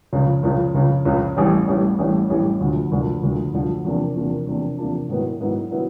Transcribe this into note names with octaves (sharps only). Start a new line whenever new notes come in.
C#2 C#3 F3
C#2 C#3 F3
C#2 C#3 F3
C#2 C#3 F3
A1 A2 E3 G3
A1 A2 E3 G3
A1 A2 E3 G3
A1 A2 E3 G3
D2 D3 F3
D2 D3 F3
D2 D3 F3
D2 D3 F3
E2 C3 F3 A#3 D4
E2 C3 F3 A#3 D4
E2 C3 F3 A#3 D4
E2 C3 F3 A#3 D4
G#2 D#3 F#3 B3 E4
G#2 D#3 F#3 B3 E4
D#3 F#3 B3 E4